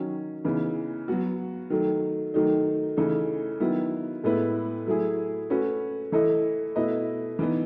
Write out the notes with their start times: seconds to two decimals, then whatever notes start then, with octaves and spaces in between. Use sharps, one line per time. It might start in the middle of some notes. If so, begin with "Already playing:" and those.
Already playing: D#3 F#3 C#4
0.44 C#3 E3 B3 D#4
1.08 F#3 B3 F#4
1.70 D#3 F#3 A3
2.34 D#3 F#3 A3 D#4
2.97 C#3 E3 A3 D#4 A4
3.60 D#3 F#3 B3 E4
4.24 A2 G#3 B3 E4 B4
4.87 F#3 A3 E4 G#4
5.50 A3 C#4 F#4 B4
6.12 E3 A3 E4 A4 D#5
6.76 B2 A3 E4 B4 D#5
7.39 E3 B3 D#4